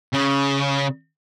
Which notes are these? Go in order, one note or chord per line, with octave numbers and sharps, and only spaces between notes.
C#3